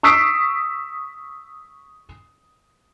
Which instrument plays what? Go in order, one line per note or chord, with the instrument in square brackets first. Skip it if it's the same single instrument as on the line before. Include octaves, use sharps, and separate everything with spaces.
[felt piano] C#6 D#6 E6 B6 C7 D7